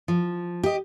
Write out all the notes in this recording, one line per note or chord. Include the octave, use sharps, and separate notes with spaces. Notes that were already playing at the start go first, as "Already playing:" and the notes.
F3
G4 D#5